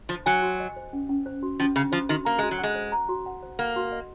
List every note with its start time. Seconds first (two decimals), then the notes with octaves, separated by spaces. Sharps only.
0.09 F3 C5
0.26 F#3 G#5
0.42 F#4
0.60 D#5
0.76 C5
0.93 C#4
1.09 C#4
1.26 C5
1.43 F#4
1.60 F3 C#4
1.76 C#3 C#4
1.92 F3 C5
2.09 D#3 F#4
2.25 A#3 A#5
2.39 G#3 F#4
2.51 F#3
2.58 G#3 F#5
2.75 C5
2.92 A#5
3.09 F#4
3.26 F#5
3.43 C5
3.59 A#3 F#5
3.76 F#4
3.92 D#5